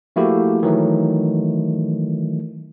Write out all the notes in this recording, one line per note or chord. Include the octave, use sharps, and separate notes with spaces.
F3 A3 A#3 E4 F#4 G4
D#3 E3 F#3 A3